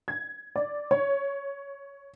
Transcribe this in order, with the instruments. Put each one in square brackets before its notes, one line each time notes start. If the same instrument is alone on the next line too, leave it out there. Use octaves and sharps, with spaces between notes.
[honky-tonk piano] G#6
D5
C#5